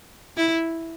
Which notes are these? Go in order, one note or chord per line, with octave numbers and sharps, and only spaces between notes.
E4